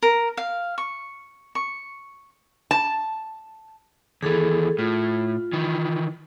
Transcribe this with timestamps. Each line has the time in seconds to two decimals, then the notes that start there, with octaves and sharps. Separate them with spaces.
0.02 A#4
0.37 F5
0.78 C#6
1.55 C#6
2.71 A5
4.23 D#2 E3 G#4 A4
4.79 A2 F4
5.53 D#3 E3